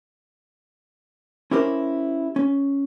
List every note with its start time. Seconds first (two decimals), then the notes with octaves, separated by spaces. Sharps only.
1.51 C#4 E4 G4 A#4 C5
2.36 C#4